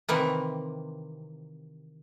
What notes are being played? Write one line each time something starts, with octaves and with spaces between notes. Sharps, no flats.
C3 D#3 E3 A#3